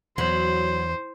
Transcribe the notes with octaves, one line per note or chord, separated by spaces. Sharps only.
E2 F#3 C5